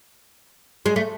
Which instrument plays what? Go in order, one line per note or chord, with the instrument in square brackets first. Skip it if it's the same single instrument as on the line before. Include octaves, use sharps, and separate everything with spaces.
[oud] G#3
A3